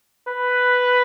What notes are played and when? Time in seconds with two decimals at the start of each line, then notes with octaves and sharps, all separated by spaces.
0.28 B4